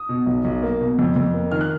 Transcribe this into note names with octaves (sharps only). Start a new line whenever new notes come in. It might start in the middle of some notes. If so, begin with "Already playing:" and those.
Already playing: D#6
B2
B1
B1
A#3
B2
F2
F2
A#3
D#3 F6
F#6